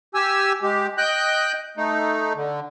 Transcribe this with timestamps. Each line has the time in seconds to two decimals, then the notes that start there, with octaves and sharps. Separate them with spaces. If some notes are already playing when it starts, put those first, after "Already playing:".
0.14 G4 G#5 E6
0.62 G#3 G4
0.98 D#5 G5 F#6 G6
1.77 A3 D#4
2.35 D3